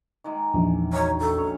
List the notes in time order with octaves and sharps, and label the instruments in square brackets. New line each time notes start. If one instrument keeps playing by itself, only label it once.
[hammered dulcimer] D#3 G#3 A#3
[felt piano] A#1 [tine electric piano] E2
[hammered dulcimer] D#3 F#3 D#4 [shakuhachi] C#5
[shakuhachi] A4
[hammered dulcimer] C#4 C#5